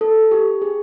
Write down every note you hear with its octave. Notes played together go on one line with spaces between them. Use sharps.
A4
G4
G#4